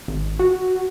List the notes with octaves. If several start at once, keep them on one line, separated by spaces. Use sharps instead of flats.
G#1
F#4